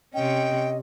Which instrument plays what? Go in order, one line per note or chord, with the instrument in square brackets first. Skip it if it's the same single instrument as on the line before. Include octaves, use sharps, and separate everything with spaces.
[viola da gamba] C3 C#4 [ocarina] D#5 [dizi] G5